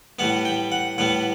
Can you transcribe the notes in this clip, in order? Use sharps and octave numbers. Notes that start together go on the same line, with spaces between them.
A2 G3 B3 F#5
G5
F#5
A2 G3 B3 F#5